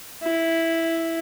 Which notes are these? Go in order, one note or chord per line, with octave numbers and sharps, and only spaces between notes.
E4